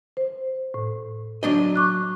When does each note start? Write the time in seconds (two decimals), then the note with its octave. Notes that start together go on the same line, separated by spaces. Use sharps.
0.17 C5
0.74 A2
1.43 F#3 D4 D#5
1.76 C#6 D6 F#6